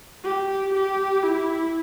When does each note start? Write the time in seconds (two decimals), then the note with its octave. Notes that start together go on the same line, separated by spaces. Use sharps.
0.24 G4
0.74 G4
1.23 E4